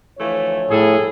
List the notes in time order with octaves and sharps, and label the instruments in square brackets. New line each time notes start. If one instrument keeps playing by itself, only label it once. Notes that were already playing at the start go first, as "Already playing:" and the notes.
[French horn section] D2 F3 C#5 [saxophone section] E3 A3 F4
[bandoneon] A2 [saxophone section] G3 A4 [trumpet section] G#4